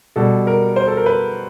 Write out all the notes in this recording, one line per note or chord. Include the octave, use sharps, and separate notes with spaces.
B2 G3 A4
A#4
C5
A4
A#4
B4